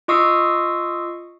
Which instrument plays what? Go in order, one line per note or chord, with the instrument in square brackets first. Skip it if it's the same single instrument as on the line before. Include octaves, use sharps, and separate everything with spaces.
[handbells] F4 D#5 C#6 D#6 E6 C7